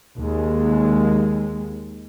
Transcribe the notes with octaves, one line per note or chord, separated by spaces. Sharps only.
D#2 G#3